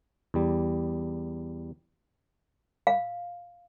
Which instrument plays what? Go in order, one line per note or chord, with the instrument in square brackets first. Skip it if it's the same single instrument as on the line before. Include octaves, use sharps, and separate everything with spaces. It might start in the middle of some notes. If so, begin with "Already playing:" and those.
[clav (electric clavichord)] E2 G3
[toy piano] F5